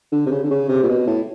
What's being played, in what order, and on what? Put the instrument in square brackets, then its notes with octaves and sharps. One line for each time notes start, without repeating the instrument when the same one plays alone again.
[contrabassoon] D3
C3
C#3
D3
C#3
C3
A#2
B2
A2